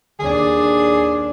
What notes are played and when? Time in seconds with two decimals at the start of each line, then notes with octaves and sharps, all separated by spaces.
0.20 D#2 D4 G#4